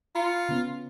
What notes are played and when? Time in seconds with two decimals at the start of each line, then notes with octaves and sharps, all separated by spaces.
0.15 F4 A#5 B5 C#7
0.49 C#3 B3 C#4